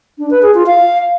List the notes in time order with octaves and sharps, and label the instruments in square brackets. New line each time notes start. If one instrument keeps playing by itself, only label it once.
[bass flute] D4
B4
G#4
F4
F5